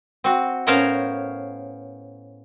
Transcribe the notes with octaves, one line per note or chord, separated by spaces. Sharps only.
C4 F#4
A2 B3 C#4 A#4 C5 F5